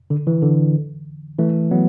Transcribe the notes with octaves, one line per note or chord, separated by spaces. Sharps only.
D3
E3
D3
E3 A3
F#3 B3